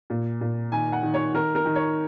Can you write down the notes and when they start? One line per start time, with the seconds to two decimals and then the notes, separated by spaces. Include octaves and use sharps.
0.10 A#2
0.41 A#2
0.72 D#3 G#5
0.92 F#5
1.03 D#3
1.14 C#5
1.34 D#3 A#4
1.55 A#4
1.65 D#3
1.75 C#5